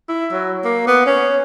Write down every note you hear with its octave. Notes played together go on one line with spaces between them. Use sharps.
E4
F#3
A#3
B3
C#4